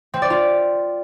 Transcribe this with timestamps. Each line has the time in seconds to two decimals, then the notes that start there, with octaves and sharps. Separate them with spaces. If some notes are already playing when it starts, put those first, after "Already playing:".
0.14 C4
0.22 D5
0.30 F4